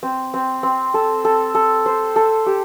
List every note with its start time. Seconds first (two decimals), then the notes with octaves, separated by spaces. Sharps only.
0.03 C4
0.34 C4
0.63 C4
0.94 A4
1.25 A4
1.55 A4
1.86 C5
2.16 A4
2.46 G4